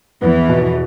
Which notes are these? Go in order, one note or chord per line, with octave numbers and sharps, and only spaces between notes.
E2 E3 B3
B2